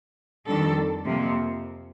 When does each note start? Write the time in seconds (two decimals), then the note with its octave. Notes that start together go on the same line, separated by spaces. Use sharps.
0.46 F2 D#3 G3 D4 A4
1.05 F2 C3 F3 A#3